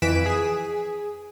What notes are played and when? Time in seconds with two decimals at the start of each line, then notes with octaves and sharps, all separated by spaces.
0.02 F2 E3 B4 B6 D7 E7
0.26 G#4